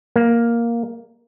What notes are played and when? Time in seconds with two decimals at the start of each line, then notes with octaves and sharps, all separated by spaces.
0.16 A#3